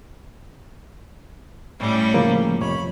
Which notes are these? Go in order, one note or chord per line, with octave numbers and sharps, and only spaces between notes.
A2 G3 C#4
C#3 F3 A#3
F2 C3 C#5 B5